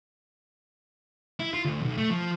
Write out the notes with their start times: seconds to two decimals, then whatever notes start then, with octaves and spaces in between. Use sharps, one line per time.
1.40 E4
1.54 F4
1.65 D2
1.82 B1
1.98 A3
2.10 F3